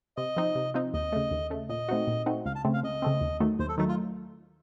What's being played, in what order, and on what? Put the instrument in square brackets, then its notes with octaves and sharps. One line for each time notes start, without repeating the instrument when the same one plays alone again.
[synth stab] C3 [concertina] D#5
[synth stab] F3 C4 D#4
C3
F3 C4 D#4
[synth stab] D#2 [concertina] D#5
[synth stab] C#3 A3
D#2
C#3 A3
[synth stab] A#2 [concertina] D#5
[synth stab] A3 C4 D#4 F#4
A#2
A3 C4 D#4 F#4
[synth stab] C#2 [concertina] F5
[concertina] A5
[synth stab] C#3 A3 C4
[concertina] F5
[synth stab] C#2 [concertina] D#5
[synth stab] C#3 A3 C4
D#2
D#3 F#3 A3
[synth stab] D#2 [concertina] C5
[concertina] A4
[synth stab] D#3 F#3 A3 [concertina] D#4
[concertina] F4